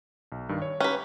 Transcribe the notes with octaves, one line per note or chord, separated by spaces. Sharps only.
B1
G2 D#3
C#5
C#4 G4 B4 A#5 F#6